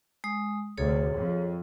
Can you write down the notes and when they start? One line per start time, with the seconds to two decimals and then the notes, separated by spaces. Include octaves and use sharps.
0.24 G#3 D#6
0.78 D2 C3 G#4 A4 C#5
1.15 F2